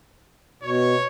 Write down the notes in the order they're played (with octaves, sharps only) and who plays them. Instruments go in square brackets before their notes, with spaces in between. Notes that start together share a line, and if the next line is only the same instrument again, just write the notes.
[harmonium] B2 [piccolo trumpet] C#5